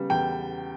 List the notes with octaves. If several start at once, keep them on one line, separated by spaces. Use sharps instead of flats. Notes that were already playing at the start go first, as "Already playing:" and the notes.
Already playing: C#3 G3 B3
E2 G5